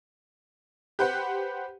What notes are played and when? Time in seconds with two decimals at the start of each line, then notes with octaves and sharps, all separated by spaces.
0.99 G4 B4 C5 F#5